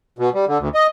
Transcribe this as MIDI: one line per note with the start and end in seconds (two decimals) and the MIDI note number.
0.19 0.30 47
0.34 0.45 55
0.48 0.58 50
0.59 0.69 38
0.75 0.87 75